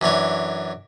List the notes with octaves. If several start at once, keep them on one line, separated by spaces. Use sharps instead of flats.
F#2 E3 D4 C#5